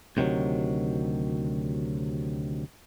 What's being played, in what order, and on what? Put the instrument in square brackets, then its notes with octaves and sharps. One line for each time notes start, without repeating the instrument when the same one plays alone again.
[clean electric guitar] D2 C3 D#3 F3 F#3